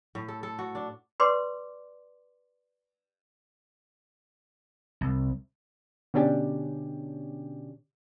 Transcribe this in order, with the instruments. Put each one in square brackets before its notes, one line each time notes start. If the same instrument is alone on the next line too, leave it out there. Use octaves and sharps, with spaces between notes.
[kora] A2
A4
A4
F#4
D4
[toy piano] G4 B4 D5 C6 D6
[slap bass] C2
[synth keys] B2 D3 C#4 D4 G4